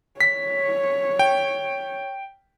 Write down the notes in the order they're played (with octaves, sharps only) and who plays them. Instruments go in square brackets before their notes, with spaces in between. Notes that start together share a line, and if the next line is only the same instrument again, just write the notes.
[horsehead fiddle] C#5 [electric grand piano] B6
[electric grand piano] G5